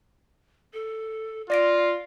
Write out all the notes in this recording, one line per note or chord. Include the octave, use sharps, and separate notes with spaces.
A4
F4 D5 F5 A#6 D7